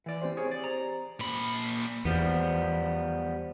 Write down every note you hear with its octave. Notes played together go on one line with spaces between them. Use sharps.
E3 D5
C4 G4 C5
G#4 C#5
D5
A#5
A#2 B5
E2 F3 G3 B3